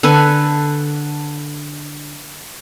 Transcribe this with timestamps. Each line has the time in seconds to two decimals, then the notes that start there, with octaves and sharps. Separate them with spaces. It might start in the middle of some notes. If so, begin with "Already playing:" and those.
0.03 D3 A4 B4 G#5